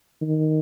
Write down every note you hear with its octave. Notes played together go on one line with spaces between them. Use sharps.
D#3